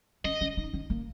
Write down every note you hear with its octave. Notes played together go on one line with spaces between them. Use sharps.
C#4 D#5
C#4
D#4
C#4
A#3